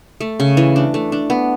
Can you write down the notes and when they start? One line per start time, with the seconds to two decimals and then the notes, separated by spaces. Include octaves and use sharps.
0.21 A3
0.40 C#3
0.57 E3
0.76 D4
0.94 A3
1.12 D4
1.30 B3